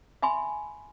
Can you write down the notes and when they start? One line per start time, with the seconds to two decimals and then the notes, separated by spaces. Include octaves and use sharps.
0.22 E5 G#5 B5 C6